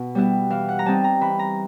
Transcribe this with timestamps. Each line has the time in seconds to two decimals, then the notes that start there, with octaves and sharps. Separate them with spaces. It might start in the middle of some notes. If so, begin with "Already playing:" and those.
Already playing: B2
0.15 G3 B3 E4
0.50 E3 F5
0.69 F#5
0.79 A#5
0.86 G3 C4 D#4 A5
1.04 A#5
1.21 E3 B5
1.39 A#5